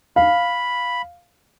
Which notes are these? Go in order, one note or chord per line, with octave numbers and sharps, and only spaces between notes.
F5 B5